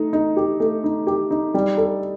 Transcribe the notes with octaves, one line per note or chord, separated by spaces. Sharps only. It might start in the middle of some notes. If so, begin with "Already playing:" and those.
Already playing: A3 D#4
D#4
G4
A3
D#4
G4
D#4
G3
A4